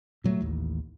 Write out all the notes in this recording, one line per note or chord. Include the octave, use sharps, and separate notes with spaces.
A#2 F#3 G#3 A3
A1 D#2